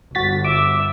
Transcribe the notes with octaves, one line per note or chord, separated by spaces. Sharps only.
G1 F#4 A6 B6
E5 D6